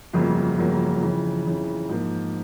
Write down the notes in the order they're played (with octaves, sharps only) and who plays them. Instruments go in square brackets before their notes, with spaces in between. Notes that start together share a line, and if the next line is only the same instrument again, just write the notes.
[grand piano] G1 F2 C#3 F#3 A#3
G1 F2 C#3 F#3 A#3
F2 C#3 E3
F2 C#3 E3
G#2 F3 A#3